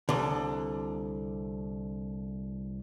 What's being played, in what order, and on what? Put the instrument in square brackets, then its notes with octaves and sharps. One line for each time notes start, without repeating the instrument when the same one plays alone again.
[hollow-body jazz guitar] C2 D3